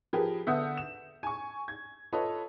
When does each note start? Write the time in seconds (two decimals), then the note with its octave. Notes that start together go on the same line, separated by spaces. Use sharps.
0.13 F3 G4 G#4 A#4 B4
0.47 D3 B3 E5 F#5 D#6 G6
0.77 E7
1.23 G#5 C#6
1.68 G#6
2.13 F4 A4 B4 C#5 D#5